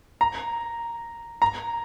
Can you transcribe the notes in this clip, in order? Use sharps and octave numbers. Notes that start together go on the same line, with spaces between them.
A#5
A#5